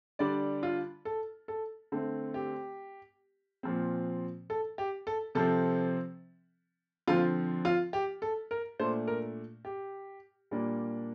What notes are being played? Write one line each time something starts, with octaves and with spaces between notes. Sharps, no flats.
D3 G3 D4 D5
F4
A4
A4
D3 A3 C4
G4
A#2 F3 C4
A4
G4
A4
C3 F3 C4 A4
D3 F3 C4 F4
F4
G4
A4
A#4
A#2 A3 D4 C5
A#4
G4
A#2 G3 A#3 D4